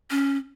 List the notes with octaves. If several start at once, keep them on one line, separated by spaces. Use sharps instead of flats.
C#4